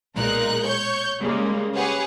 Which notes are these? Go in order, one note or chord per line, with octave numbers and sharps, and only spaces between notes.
B1 A#2 G#3 D#4 A#4 F#6
C#5 C#6 G6
C#3 G3 G#3 A#3
G4 G#4 B4 C#5 F#5